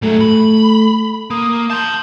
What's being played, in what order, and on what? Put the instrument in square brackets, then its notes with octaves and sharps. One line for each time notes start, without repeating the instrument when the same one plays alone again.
[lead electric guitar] G#2 F#3 [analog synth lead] A3
[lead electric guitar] B5
[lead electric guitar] A#3 [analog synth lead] D#6
[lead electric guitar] A5 C6 [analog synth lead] G6